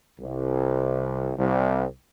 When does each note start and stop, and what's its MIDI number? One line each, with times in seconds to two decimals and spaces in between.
0.20 1.32 36
1.37 1.84 36